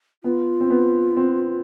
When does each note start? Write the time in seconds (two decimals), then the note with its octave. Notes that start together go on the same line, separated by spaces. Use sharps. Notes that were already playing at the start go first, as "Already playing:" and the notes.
0.24 B3 F4
0.60 C4
0.70 B3
1.17 C4